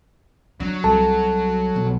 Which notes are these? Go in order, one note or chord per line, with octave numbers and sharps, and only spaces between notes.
F#3 D4
C2 A4 A5
B1